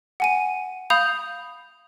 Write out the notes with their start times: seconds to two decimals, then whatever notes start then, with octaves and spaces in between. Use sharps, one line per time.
0.20 F#5 G#5 D#7
0.90 F5 B5 D#6 G6 F7